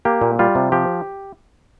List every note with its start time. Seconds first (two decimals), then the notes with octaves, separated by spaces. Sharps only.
0.05 A#3 G4
0.22 A#2
0.39 G3 F4
0.55 C3
0.72 F3 G4